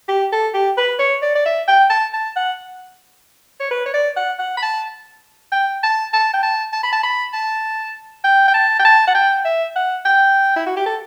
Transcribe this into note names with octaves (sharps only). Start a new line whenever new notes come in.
G4
A4
G4
B4
C#5
D5
D5
E5
G5
A5
A5
F#5
C#5
B4
C#5
D5
F#5
F#5
B5
A5
G5
A5
A5
G5
A5
A5
B5
A5
B5
A5
G5
G5
A5
G5
A5
F#5
G5
E5
F#5
G5
E4
F#4
G4
A4